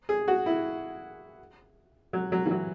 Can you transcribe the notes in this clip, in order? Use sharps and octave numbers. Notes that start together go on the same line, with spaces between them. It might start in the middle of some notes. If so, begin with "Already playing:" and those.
G#4
F#4
E4
F#3
F#3
E3
F#3